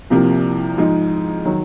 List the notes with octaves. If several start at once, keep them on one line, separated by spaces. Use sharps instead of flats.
C2 C3 F3 A#3
G#2 F3 G#3 D#4
D#3 F#3